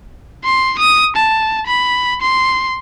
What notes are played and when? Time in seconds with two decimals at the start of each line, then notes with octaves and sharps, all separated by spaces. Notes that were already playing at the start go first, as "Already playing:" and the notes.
0.45 C6
0.79 D#6
1.16 A5
1.67 B5
2.22 C6